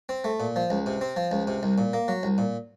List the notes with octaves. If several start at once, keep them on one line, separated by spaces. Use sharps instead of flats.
C4
A3
A#2
F3
C#2
C3
C4
F3
C#2
C3
C2
A#2
A#3
F#3
C2
A#2